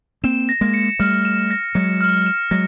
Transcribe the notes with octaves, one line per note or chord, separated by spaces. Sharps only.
A#3 C4 E7
A#6
G#3 A#3
C#7
G3 A3 F6
E7
A#6
F#3 G#3 C#7
F6
E7
F#3 G#3 A#6